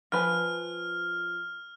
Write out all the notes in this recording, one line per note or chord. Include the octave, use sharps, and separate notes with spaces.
F3 B4 G#5 F6